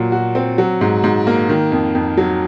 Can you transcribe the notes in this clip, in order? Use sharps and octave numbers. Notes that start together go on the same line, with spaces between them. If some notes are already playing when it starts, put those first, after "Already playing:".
Already playing: A#2 F#3
F#4
C4
F#3
G#2
G#2
A#3
D#3
F2
F2
F#3